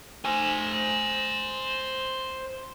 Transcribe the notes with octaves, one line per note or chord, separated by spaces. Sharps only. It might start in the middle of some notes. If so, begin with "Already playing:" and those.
C5 G#5